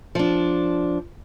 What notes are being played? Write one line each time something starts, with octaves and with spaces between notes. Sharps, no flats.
F3 D4